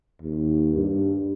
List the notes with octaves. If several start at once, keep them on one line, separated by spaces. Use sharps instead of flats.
D#2
G2